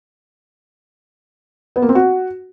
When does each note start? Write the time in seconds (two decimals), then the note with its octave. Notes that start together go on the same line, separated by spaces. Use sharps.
1.76 B3
1.82 A#3
1.89 C4
1.95 F#4